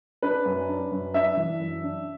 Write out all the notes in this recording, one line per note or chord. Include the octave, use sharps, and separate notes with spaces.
D4 B4
F#2
D4
F#2
D4 E5
E3
F#2
D4